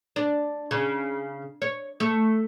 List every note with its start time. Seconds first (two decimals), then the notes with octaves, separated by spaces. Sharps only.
0.16 D4
0.71 C#3
1.62 C#5
2.00 A3